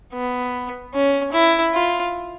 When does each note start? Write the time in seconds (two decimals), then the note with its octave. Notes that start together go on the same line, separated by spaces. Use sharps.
0.13 B3
0.94 C#4
1.33 E4
1.74 F4